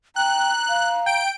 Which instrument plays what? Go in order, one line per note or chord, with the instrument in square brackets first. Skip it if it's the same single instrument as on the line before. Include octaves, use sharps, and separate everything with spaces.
[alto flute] G5 [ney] A#5 [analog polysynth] F#6
[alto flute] F5
[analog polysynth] G5 D7